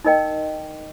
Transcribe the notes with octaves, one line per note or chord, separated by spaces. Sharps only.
D#4 A#4 D#5 G5